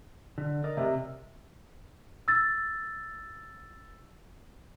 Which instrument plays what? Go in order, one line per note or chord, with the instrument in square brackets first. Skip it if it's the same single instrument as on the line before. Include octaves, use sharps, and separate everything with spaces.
[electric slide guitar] D3
A#4 D5 D#5
[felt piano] C3
[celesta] E6 A6